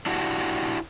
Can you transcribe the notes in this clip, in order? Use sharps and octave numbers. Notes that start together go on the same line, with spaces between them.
D4 E4 F#4 G4